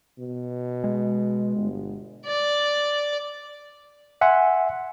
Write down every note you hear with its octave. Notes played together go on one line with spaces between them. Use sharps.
B2
G#3
G1
D5
E5 F#5 G#5 C6